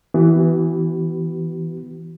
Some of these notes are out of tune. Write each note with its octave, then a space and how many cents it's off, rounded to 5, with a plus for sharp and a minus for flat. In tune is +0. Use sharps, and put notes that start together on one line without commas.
E3 +0 B3 +15 F#4 +45